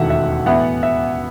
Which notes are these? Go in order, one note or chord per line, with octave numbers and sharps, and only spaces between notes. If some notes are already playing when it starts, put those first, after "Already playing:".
Already playing: E1 D#2 D#3 A3 E4 E5 F#5
E5
A2 E3 B3 E4 F#5
E5